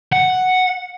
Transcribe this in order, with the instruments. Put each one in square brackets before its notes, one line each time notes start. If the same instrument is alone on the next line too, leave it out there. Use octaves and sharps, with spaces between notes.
[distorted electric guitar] F#5